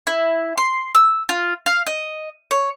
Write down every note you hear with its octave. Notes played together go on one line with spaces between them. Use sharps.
E4
C6
E6
F4
F5
D#5
C#5